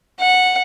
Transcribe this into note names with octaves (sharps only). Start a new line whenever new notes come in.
F#5